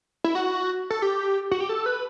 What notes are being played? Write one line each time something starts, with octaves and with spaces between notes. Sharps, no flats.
E4
F#4
A4
G4
F#4
G4
A4
B4